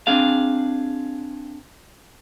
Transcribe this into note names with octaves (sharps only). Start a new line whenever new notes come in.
C4 D4 G#4 F5